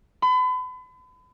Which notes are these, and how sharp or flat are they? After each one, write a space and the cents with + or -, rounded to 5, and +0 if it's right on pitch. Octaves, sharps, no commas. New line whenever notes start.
B5 +40